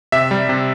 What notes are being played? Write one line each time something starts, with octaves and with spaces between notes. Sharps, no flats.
C3 E5
G3
C3